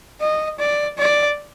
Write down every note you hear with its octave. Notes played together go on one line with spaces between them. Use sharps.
D#5
D5
D5